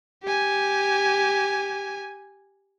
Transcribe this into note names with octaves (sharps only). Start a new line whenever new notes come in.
G4 G#5